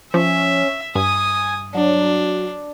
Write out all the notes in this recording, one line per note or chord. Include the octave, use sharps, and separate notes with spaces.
F3 C#4 E5
G2 G#5 D#6
F#3 D4